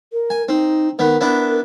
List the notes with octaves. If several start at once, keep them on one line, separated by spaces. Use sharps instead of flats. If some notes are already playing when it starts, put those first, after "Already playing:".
A#4
G#5
C4 D#4
D#3 B3 A#4
B3 D4 E4